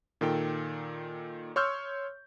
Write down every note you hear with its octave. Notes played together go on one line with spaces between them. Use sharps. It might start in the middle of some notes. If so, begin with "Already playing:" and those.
A#2 D#3 A4 G5
C#5 C6 C#6 E6 F6 G6